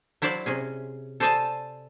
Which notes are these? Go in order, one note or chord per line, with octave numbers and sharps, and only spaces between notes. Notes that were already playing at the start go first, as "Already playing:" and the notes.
F#3 E4 C5 D5 F5
C3 C#4 G#4
A4 C5 D5 D#5 G#5 A5